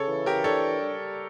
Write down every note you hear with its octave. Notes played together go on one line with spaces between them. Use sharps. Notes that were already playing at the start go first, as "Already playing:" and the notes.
Already playing: C#3 A4 C#5
E3
G4 A#4
D4 A4 C#5
G3